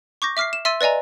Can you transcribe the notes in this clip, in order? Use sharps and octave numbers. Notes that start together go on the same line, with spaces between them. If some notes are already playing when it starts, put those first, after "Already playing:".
C#6 D6 G6 A#6
E5 D6 F6 B6 C7
E7
E5 C6 E6 A6 D#7
B4 D5 D#5 G#5 A#5